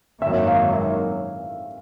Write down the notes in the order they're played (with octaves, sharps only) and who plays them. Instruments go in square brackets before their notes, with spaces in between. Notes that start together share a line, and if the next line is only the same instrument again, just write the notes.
[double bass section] G#1 F#2 D#3 F#3 A#3 [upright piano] E5
[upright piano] F5
E5